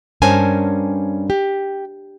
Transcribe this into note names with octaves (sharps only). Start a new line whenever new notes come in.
G2 C#4 A#4 C5 G#5 A5
G4